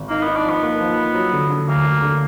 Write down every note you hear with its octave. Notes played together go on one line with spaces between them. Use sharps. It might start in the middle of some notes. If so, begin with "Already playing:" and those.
Already playing: G#1
A#3 D#4
B3 D#4
D4
F3 B3
A#3
F3
F3
F#3
D3
D3
D2 A#3
D2
D3